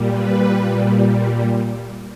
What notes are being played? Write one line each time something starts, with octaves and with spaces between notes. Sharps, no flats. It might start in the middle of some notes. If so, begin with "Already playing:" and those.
Already playing: A#2 G3
B4